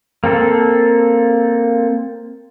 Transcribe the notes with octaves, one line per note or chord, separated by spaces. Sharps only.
A#3 C4 A4